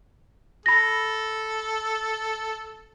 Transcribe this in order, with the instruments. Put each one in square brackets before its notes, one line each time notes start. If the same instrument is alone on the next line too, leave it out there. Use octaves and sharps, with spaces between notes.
[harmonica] A4 [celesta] B5 A#6